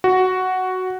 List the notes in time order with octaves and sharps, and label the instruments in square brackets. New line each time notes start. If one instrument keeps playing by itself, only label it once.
[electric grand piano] F#4